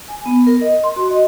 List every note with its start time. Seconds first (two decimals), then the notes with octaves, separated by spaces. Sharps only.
0.08 G#5
0.26 B3
0.47 A#4
0.61 D#5
0.84 C6
0.96 F#4
1.11 D#5